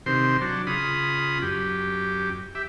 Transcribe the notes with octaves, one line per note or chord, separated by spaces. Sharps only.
C3 D#3 C5 C6
F#3 D4
C#3 F4 B5 D#6
F#2 G4
G4 E5